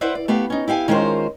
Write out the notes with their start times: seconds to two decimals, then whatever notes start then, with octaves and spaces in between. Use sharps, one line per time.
0.01 E4 B4 C5 D5 E5 F#5
0.15 D5
0.28 A3 B3 G4 F5
0.50 C#4 D#4
0.68 E4 G4 F5 G#5
0.88 D#3 G#3 C#4 F4 A#4 C5